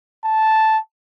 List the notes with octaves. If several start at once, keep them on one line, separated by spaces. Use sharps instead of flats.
A5